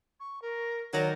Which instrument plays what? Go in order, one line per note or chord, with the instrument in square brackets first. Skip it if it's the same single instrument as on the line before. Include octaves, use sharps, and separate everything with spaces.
[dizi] C#6
A#4
[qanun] D#3 D5 A#5 [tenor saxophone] F#3 [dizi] A#4